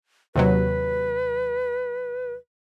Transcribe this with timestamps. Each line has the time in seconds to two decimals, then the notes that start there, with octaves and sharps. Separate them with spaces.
0.36 D#2 C3 F#3 B4